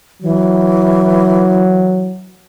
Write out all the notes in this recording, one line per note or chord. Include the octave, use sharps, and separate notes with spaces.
E3 F#3